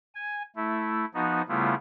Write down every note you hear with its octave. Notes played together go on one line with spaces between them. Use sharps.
G#5
A3 E4
F3 B3 D#4 F#4
C#3 G3 A3 B3 E4 F4